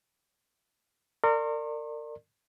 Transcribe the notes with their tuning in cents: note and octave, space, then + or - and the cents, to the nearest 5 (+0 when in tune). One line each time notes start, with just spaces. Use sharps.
A#4 -35 D5 +15 C6 +45